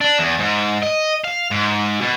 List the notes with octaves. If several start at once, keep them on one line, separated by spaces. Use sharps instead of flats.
D4
E2
G#2
D#5
F5
G#2
B2